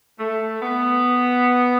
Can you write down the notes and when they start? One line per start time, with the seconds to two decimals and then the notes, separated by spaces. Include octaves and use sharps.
0.19 A3
0.61 B3